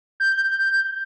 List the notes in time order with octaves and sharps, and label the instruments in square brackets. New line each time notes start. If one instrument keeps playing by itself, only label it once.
[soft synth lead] G6